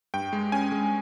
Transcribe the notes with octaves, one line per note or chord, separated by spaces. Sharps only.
G2 G5
G#3
C#4 G#5
G#3